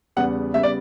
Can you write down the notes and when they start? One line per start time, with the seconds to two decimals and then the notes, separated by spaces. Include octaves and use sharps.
0.16 E2 C#3 G3 B3 F#5
0.54 C#3 G3 B3 E5
0.63 D5